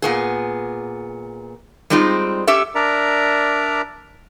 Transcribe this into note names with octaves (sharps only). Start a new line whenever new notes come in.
A#2 B3 G#4
G3 G#3 C4 D#4 F4
C#4 G4 A4 E5
D4 A#4 D5 E5 A#5